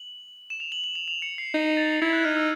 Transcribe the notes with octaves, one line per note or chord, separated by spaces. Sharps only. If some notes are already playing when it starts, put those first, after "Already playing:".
Already playing: F#7
E7
F7
F#7
F#7
F7
F7
C#7
C7
D#4
A6
E4 G#6
F#6
D#4 F6
E6